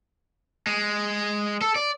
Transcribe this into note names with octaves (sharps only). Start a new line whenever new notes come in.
G#3
A4
D5